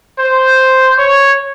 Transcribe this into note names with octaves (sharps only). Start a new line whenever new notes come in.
C5
C#5